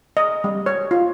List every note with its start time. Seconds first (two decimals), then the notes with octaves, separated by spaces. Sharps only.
0.17 D#5
0.44 G3
0.66 C#5
0.91 F4